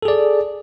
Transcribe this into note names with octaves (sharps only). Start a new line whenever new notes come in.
G#4 A4 D5